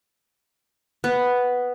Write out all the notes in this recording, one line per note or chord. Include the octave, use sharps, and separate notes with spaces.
B3